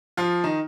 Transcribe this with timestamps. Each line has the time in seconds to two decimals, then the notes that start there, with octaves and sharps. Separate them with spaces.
0.17 F3 F4
0.44 D#3 D#4